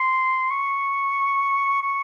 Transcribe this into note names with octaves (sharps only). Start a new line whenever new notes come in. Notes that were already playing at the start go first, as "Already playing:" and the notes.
Already playing: C6
C#6
C#6